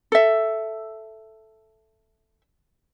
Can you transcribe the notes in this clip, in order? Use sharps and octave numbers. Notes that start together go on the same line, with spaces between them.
A4 E5